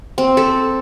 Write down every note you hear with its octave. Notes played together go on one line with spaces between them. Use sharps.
C4
A4